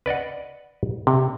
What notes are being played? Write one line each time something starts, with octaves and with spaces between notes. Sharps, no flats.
B4 D5 D#5 F#5
C3